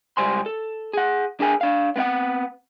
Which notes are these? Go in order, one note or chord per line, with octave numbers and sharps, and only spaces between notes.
C#2 G3 C5 G#5 C6
A4
G#4 F#5
D4 G#4 A#4 G#5
D4 F5
B3 C4 F5 F#5